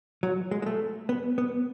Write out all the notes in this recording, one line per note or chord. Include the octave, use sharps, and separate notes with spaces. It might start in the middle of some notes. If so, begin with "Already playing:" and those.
F#3
G#3
G#3
A3
B3
B3